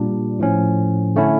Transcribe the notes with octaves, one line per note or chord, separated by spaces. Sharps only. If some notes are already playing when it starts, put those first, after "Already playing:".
Already playing: A#2 G3 D4
A2 F3 C#4
D3 A3 C#4 E4